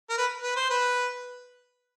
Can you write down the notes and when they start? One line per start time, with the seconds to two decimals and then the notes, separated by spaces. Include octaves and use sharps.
0.10 A#4
0.18 B4
0.42 B4
0.56 C5
0.70 B4